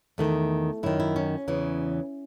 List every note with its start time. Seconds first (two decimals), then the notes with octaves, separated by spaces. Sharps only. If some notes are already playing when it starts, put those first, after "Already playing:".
0.18 E2 D#3 A3
0.83 F#2 D#3 E4
1.00 E4
1.16 C#4
1.48 E2 C#3 E3